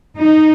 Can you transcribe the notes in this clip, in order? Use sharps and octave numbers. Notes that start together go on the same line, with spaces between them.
D#4